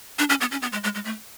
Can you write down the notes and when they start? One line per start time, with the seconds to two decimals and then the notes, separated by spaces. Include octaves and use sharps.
0.19 D4
0.30 C#4
0.41 B3
0.52 C#4
0.62 B3
0.72 G#3
0.84 G#3
0.95 G#3
1.05 A3